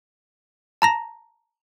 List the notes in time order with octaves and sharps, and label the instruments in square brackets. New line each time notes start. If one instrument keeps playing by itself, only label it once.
[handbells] A5 A#5 A#6